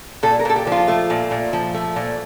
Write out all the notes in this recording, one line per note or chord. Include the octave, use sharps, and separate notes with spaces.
A#2 A4
A#4
A#2 A4
G4
F3 F4
A3
A#2
A#2
F3
A3
A#2